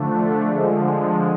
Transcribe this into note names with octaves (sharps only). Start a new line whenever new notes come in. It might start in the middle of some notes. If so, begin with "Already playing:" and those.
Already playing: D3 F3 A3 D4
D3 F3 G#3